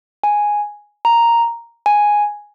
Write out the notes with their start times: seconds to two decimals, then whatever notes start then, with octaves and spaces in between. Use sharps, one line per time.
0.24 G#5
1.05 A#5
1.86 G#5